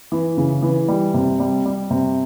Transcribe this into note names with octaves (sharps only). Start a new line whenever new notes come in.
E3
C#3
E3
G3
C3
G3
G3
C3